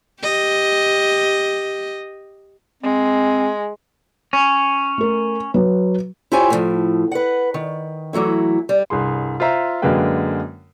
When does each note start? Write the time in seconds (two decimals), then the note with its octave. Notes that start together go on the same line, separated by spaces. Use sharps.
0.21 G4 D#5
2.83 G#3 C4
4.33 C#4
4.98 A3 A#4
5.54 F#3 B4
6.32 E4 F4 G4 C5 C#5 G#5
6.50 A2 C#3 F3
7.12 B4 F#5
7.54 D#3
8.13 E3 F#3 A3 E4
8.69 G3
8.90 C2 G2 G#4 C6
9.40 F4 C5 E5 A#5
9.82 F#2 D3 G#3 A#3 B4 G5